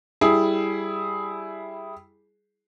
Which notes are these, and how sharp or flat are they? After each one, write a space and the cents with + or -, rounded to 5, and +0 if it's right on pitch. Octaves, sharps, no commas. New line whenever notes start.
G3 +0 E4 +0 G#4 +10